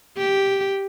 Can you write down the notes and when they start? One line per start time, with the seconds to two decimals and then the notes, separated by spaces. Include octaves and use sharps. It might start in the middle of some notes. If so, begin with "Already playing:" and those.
0.18 G4